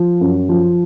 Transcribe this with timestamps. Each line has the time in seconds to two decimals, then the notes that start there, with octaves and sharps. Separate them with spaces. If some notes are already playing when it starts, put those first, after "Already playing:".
Already playing: F3
0.21 F#2
0.49 F3